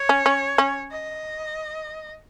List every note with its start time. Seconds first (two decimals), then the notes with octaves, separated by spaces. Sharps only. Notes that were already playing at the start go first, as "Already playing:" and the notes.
Already playing: C#5
0.09 C#4
0.26 C#4
0.58 C#4
0.92 D#5